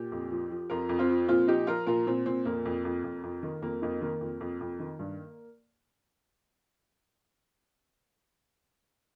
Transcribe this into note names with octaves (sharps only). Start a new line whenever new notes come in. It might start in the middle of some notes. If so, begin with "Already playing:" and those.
Already playing: A#2 G4
F2
F3
F3
F2 F4 A#4
F2
C4 F4
F3
A#2 C4 F4
F3 D#4 G4
F3 F4 A#4
A#2 F4 A#4
A#2 C4
A#2 C4
F2 A#3
F2
F2
F2
F2
D#3
F2 A#3
F2 A#3 D#4
D#3 A#3
F2
F2
F2
D#3
G2